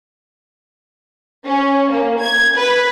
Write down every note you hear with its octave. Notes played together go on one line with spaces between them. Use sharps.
C#4
A#3
G#6
B4